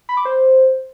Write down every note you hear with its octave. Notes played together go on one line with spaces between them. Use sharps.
B5
D6
C5